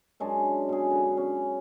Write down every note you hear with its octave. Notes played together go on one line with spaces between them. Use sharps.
F#2 G#3 C#4 D4
B2 G#4
D3 B4
C#4